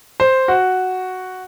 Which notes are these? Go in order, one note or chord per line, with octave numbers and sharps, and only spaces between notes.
C5
F#4